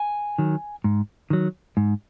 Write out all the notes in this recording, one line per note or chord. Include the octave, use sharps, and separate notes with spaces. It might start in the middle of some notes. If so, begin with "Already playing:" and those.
Already playing: G#5
D#3 F#3
G#2
D#3 F#3
G#2